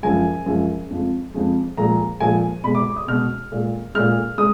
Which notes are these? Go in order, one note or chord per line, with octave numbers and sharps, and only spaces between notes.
F#2 F3 G#3 G#5
F#2 F3 G#3
F2 F3 G#3
F2 F3 G#3
A#2 F3 G#3 A#5
A#2 F3 G#3 G#5
B2 G#3 B5
D6
D#6
B2 G#3 F6
A#2 G#3
A#2 G#3 F6
G#3 D#6